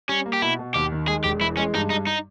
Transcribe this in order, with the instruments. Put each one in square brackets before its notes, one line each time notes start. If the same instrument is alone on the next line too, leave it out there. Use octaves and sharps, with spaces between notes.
[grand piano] G3 [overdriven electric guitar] C#4
[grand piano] A#3
[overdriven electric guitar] G4
[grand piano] B2 [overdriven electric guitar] E4
[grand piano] B2
[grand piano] D#2 [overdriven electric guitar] G4
[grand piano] D#3
[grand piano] G#3 [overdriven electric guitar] G#4
[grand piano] E1 [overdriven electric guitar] G4
[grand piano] E3 [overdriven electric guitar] E4
[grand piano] G#3 [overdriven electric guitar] C#4
[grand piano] G2 [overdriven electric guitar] D#4
[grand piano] G2 [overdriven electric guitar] D#4
[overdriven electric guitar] D#4